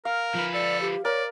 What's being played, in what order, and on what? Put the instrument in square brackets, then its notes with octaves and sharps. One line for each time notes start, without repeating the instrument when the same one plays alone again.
[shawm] A#4 [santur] F5
[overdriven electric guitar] F3 B4
[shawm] A4 [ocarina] D5
[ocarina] G4
[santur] A#4 [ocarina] C#5 [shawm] D5